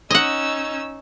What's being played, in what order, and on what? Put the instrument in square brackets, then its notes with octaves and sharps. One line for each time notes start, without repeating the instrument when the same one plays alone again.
[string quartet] C#4 D#4 E6 [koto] D#5 F#5